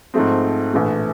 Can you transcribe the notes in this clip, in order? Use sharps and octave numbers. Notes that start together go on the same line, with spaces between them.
G#2 F3 A3 C4
A#1 A2 E3 A3